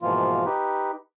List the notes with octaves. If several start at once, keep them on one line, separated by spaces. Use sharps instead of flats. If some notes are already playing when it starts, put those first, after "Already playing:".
G#2 B2 E3 F3 A#3 F4
D#4 G4 B4